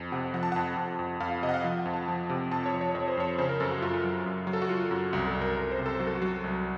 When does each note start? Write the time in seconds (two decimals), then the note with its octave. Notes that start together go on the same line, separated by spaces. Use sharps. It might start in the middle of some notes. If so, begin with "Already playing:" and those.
Already playing: F2
0.12 C3 F#5
0.34 F3 F#5
0.43 A5
0.52 F2 F#5
0.77 F2
0.99 F2
1.20 F2 F5
1.31 F5
1.42 C3 D#5
1.49 F#5
1.54 F5
1.64 F3
1.79 F#5
1.86 F2
1.93 A5
2.08 F3
2.30 C3
2.52 F2 A5
2.66 C#5
2.73 F3
2.81 C#5
2.95 F2 C#5
3.08 C5
3.17 F2 C#5
3.38 C#3 C5
3.49 A#4
3.60 F#2 A4
3.71 F#4
3.82 F#2 F4
4.04 F#3
4.26 F#2
4.47 F#3
4.53 A4
4.62 F#4
4.69 F#3 F4
4.91 F#2
5.13 C2 F#4
5.27 A4
5.34 C2
5.41 A#4
5.56 C2 A#4
5.72 C5
5.79 C3
5.86 A4
6.00 F#3 F#4
6.07 A4
6.15 F#4
6.22 F#3
6.44 C2